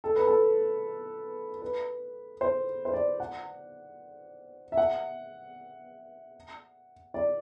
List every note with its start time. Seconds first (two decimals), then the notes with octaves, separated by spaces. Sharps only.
0.04 A4
0.16 B4
0.27 A4
1.62 B4
2.41 C5
2.85 C5
2.93 D5
3.20 F#5
4.72 E5
4.77 F#5
7.14 D5